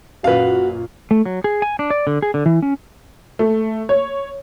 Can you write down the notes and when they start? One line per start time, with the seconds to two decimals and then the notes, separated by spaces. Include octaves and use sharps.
0.24 F#2 A#2 F#4 B4 F5
1.11 A3
1.26 F#3
1.44 G#4
1.62 G#5
1.79 D4
1.90 D5
2.07 D3
2.22 G#4
2.34 D3
2.46 E3
2.62 C#4
3.39 A3
3.89 C#5